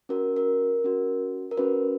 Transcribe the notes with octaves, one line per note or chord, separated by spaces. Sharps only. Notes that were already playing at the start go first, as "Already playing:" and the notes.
C#4 F#4 A#4
A#4
C#4 F#4
A#4
C#4 F#4 B4